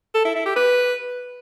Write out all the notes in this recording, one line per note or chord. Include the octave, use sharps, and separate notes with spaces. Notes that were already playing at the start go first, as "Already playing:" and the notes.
A4
E4
E4
G4
B4